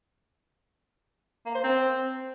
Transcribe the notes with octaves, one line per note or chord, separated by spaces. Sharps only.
A#3
C5
C4